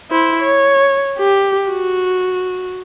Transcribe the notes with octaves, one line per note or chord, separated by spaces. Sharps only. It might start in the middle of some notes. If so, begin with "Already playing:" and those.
E4 C5
C#5
G4
F#4